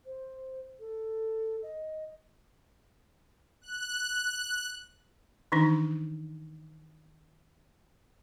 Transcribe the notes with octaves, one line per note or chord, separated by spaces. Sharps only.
C5
A4
D#5
F#6
D#3 E3 D4 D#4